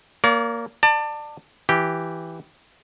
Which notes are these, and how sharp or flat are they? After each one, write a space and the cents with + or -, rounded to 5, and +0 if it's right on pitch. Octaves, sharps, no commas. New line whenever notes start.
A#3 +0 D5 -45
D5 +25 A5 +25
E3 +0 G4 -5